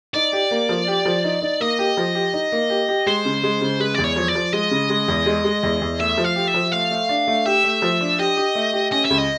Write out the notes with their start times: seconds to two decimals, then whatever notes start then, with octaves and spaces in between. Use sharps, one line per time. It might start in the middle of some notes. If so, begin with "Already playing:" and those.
0.14 D#4 D5
0.33 G4
0.51 A#3
0.69 F3
0.88 G4
1.05 F3
1.24 D#4
1.42 D#4
1.60 A#3 D#5
1.79 G4
1.97 F3
2.15 G4
2.33 D#4
2.52 A#3
2.70 G4
2.89 G4
3.07 G#3 C5
3.25 C#3
3.43 G#3
3.61 C#3
3.80 G#3 B4
3.94 E2 D5
4.04 C#5
4.16 F3
4.28 D5
4.35 F3
4.53 G#3 D#5
4.71 C#3
4.90 G#3
5.08 E2
5.26 G#3
5.45 G#3
5.63 E2
5.81 E2
6.00 A3 E5
6.18 F3
6.24 F5
6.36 G4
6.48 E5
6.54 F3
6.72 A3 F5
6.91 A3
7.09 D4
7.28 A3
7.46 G4 E5
7.64 A3
7.82 F3
8.01 D4
8.19 G4 D#5
8.37 G4
8.55 A3
8.73 G4
8.91 C#4 D#5
9.05 E5
9.10 C#2
9.18 D#5